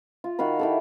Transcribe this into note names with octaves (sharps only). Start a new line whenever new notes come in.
F4
D#3 F#4 F5 B5
E4 G4 A4